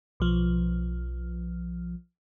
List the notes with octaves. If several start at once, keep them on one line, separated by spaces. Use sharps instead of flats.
B1 F3